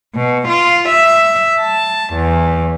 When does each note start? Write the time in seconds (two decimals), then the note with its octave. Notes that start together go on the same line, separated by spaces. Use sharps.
0.14 B2
0.49 F4
0.89 E5
1.60 A5
2.14 E2